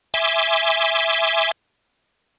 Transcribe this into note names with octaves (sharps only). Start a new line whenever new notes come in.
E5 G#5 C6 D6